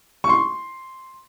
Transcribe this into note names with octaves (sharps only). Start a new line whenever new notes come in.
C#6
C6